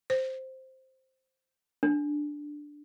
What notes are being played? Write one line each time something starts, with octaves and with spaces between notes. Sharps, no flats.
C5
D4